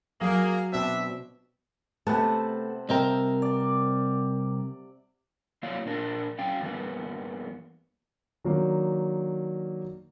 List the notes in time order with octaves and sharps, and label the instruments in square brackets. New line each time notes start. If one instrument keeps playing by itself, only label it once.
[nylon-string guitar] F#3 [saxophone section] A#3 [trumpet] G#4
[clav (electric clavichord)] B2 C4 [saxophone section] D4 [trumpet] E5
[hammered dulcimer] C3 F#5 A5 [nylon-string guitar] A3 B3
[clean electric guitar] C2 C4 A#4 [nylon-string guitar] D#5 E5 G5
[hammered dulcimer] D5
[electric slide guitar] F#3 A#3 E4 C#5 D5 F5
A#2 D4 A#4
C#4 F5 G5
G2 E3 A#3 B3
[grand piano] D#3 F#3 A#3 D4